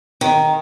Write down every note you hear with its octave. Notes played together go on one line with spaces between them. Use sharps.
D#3